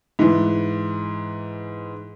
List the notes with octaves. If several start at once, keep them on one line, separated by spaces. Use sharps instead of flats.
G#2 E3